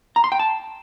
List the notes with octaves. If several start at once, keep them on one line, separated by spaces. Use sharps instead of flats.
A#5
C6
G5
A5